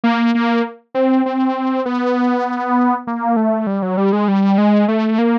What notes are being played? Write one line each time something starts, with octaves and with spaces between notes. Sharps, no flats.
A#3
A#3
C4
C4
B3
A#3
A3
G3
F#3
G3
G#3
G3
G#3
A3
A#3